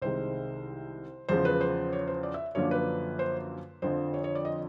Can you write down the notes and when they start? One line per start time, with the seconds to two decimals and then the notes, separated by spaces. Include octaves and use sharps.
0.02 C2 C3 D#3 G#3 C5
1.28 E2 C#3 F3 G#3 C5
1.45 B4
1.61 C5
1.93 C#5
2.07 C5
2.23 D5
2.34 E5
2.55 F#2 D3 F3 A#3 D4 C#5
2.71 B4
3.19 C5
3.82 F2 D3 F3 C5
4.14 C#5
4.24 C#5
4.35 D5
4.45 D#5